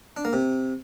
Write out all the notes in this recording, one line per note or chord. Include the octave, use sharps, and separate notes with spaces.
D4
A#3
C3